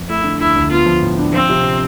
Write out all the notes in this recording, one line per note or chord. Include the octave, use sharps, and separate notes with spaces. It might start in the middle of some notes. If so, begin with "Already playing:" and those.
Already playing: F2
A3 E4
D3
D2 E4
D2
B3 F4
F3
A2
D4
F3 C4
C3